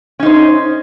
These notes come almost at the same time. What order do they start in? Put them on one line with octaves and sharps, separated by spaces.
C#4 D#4 C5